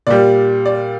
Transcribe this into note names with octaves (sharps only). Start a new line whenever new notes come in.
A#2 G3 D5
D5